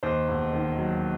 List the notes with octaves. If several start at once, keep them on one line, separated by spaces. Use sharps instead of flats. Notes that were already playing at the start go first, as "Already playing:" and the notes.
D#2 C5
E1
D#3
F#3